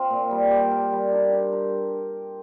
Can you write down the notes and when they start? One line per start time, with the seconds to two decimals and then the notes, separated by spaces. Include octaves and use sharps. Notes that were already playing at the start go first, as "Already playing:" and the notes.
Already playing: C4 F4
0.10 A#2
0.31 G3
0.51 G4
0.71 A#4
0.92 G3
1.12 D4
1.32 G4
1.53 A#4